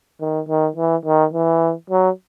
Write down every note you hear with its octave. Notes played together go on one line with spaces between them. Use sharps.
D#3
D#3
E3
D#3
E3
F#3